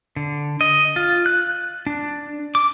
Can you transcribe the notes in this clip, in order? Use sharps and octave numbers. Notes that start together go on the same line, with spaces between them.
D3
D#5
F4
F#6
D4
D6